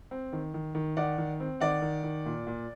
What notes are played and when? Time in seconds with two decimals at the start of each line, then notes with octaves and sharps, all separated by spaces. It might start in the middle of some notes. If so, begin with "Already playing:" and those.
0.11 C4
0.33 D#3
0.54 D#3
0.75 D#3
0.97 D#3 D5 F#5
1.18 D#3
1.40 C4
1.61 D#3 D5 F#5
1.82 D#3
2.04 D#3
2.26 A#2
2.47 A#2